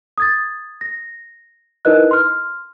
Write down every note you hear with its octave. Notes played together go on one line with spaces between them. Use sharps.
D#6 G#6 A6
A#6
D#4 E4 A#4 B4 D#5 F#6
C6 F6